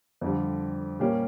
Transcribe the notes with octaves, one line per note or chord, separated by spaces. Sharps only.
F2 D3 G3
A#2 G3 A#3 C#4 G4